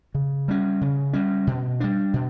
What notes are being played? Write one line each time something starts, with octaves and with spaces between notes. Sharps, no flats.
C#3
G3 C#4
C#3
G3 C#4
B2
G3 D4
B2